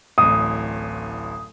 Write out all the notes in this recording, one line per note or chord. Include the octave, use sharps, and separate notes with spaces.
D1 A1 D#6